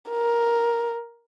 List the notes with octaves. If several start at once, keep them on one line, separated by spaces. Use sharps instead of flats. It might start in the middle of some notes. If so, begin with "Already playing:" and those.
A#4